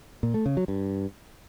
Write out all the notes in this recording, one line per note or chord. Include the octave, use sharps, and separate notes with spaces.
A#2
A3
C#3
F#3
G2